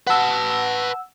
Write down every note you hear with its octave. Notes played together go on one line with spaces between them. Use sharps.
B4 F#5 A5 E6